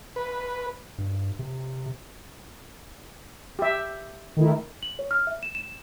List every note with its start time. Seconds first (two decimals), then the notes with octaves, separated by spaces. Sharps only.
0.16 B4
0.98 G2
1.39 C3
3.59 G4 E5
4.37 D#3 A3 E4
4.83 F#7
4.99 C#5
5.11 F6
5.27 E5
5.43 E7
5.55 E7